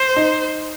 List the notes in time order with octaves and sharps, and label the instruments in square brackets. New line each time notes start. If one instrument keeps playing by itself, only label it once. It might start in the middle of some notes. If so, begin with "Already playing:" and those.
Already playing: [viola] C5
[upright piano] D#4